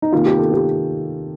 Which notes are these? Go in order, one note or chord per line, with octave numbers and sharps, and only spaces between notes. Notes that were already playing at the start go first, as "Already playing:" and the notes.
D#4
C3 D#3 A#3 F4
G4
A4
G4